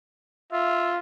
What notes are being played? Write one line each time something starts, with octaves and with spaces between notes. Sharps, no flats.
F4 E5